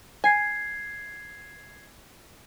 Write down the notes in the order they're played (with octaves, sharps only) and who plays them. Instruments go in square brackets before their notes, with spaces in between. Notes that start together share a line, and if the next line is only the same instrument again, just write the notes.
[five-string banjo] G#5 [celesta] G#6 C7